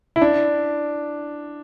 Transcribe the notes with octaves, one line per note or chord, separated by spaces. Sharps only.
E4
D4